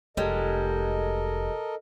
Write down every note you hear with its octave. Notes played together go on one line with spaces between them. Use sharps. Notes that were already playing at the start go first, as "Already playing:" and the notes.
F1 G3 G#3 A4 A#4 D#5